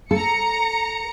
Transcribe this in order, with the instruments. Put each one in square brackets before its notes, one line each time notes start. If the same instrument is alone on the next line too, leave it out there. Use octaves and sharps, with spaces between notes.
[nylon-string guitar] A4 [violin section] A#5 C#7